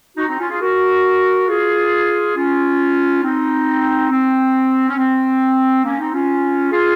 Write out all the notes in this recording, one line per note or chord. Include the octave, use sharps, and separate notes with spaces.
D#4 F#4
C4 D#4
C#4 F4
F4 G#4
F#4 A#4
F4 G#4
C#4 F4
C4 D#4
C4
C#4
C4
A#3 C#4
C4 D#4
C#4 F4
F4 G#4